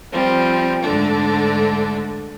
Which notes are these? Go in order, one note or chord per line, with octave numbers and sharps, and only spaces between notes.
F3 G3 C4
G#2 D3 A3 D4